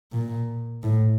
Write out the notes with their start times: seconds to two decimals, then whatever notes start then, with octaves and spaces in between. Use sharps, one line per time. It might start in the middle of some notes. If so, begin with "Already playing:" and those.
0.12 A#2
0.83 A2